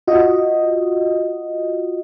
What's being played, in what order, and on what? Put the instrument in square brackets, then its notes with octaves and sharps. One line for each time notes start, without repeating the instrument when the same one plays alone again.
[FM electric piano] F4 F#4 D#5